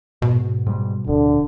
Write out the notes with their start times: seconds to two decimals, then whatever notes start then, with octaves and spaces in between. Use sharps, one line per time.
0.22 G#2 B2
0.67 G#2 G3
1.07 D1 D3